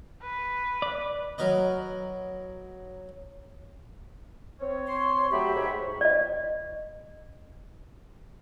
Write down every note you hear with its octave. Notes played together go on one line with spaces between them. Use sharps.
B4
D5
F#3 A#4 B4 D#5
C4 C#5
C6
F#3 A3 G4 E5 B5
G#2 C#5
D5 D#5